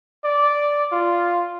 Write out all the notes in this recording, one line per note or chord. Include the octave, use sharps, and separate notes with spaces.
D5
F4